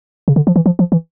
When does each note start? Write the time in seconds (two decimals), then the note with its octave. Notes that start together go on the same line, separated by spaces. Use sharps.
0.28 C#3
0.36 D3
0.47 F3
0.56 E3
0.66 F3
0.79 F3
0.92 E3